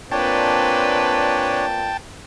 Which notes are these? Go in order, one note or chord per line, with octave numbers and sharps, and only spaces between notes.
A#2 C4 D4 B4 C#5 G5 A5